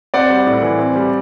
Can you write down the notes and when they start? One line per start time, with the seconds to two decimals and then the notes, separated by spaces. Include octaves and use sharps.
0.14 C4 D5 F#5
0.30 G3
0.47 A2
0.63 E3
0.79 C4
0.96 G3